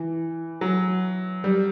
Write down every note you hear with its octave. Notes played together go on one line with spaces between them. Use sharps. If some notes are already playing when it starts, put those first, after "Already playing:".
Already playing: E3
F#3
G3